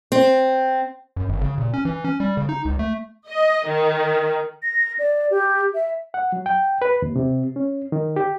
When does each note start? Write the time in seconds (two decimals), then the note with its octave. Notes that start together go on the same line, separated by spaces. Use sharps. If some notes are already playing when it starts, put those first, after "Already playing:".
0.12 C4
1.17 F#2
1.29 G#1
1.42 C#3
1.58 A#2
1.74 C#4
1.85 E3
2.04 C#4
2.20 G3
2.37 C#3
2.49 D#4
2.65 C#2
2.79 A3
3.28 D#5
3.68 D#3
4.62 A#6
4.99 D5
5.31 G4
5.74 E5
6.14 F#5
6.32 F#3
6.46 G5
6.82 B4
7.02 D#2
7.16 C3
7.56 C#4
7.92 D#3
8.16 G4